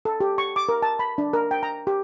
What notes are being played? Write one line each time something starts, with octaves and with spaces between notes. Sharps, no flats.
A4
G4
C#6
D6
A#4
A5
B5
D4
A#4
G5
A#5
G4